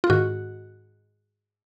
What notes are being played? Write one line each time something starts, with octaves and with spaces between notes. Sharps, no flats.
F4
G#2 D#3 F#4